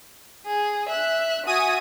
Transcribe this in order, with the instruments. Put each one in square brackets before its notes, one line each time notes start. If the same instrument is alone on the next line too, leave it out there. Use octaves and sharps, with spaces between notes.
[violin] G#4
E5 F#6
[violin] F#4 E5 [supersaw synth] G#5 D#6 D#7